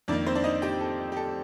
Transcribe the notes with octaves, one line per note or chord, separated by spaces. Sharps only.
F2 D#3 A#3 D4 D5
C4 C5
D4 D5
D#4 D#5
G4 G5
A4
G4
A4